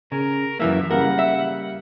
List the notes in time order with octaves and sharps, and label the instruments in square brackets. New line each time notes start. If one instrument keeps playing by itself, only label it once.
[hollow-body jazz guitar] C#3 [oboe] A#4
[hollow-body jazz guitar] F#2 E3 A#3 [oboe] E5
[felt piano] C#3 G3 A#3 [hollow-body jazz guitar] A#4 [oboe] F#5
[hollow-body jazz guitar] E5